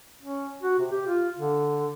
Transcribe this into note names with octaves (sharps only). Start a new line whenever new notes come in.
C#4
F#4
C3
G4
F4
D3